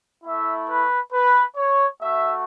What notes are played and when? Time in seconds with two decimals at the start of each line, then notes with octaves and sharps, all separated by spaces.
0.23 A3 E4 E5
0.68 B4
1.13 B4
1.57 C#5
2.02 A3 F#4 E5